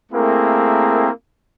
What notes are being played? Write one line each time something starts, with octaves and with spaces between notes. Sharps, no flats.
A3 A#3 C4 E4 G#4 A#4